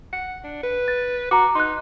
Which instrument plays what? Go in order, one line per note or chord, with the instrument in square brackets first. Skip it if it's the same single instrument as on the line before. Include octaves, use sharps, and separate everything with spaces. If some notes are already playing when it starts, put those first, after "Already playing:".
[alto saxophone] F#5
D4
B4
[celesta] A6
[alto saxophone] F#4 [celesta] A#5 D6
[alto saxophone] D#4 [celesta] C6 F#6